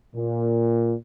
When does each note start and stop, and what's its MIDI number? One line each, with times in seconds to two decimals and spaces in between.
0.15 0.92 46